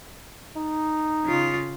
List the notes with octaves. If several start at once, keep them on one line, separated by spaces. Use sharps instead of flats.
D#4
C#3 F4